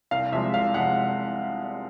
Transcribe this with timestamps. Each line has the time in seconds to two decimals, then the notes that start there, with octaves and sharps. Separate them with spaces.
0.11 C2 F5
0.32 C3 F3 G#3 E5
0.54 C2 F5
0.74 C3 F3 G#3 F#5